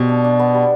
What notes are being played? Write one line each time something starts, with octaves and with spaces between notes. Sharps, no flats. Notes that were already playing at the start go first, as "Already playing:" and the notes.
Already playing: B2 C4 G4 D5
D4
D4
B3
G3